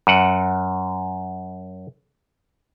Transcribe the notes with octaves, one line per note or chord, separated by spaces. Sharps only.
F#2 F#5